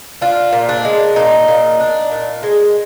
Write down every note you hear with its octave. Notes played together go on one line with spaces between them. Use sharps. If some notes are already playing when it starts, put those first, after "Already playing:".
D4 F4
A#2
D4
G#3
A#2 D#4
A#2
D4
A#2
G#3